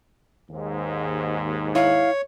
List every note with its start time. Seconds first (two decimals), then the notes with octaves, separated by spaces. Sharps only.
0.50 D#2 G#2
1.75 E4 C#5 F5